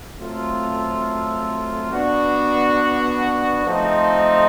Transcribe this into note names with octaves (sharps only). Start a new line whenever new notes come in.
F#3 A3 C4 F4 A4
B3 D4 F#4
F3 A3 C4 D#4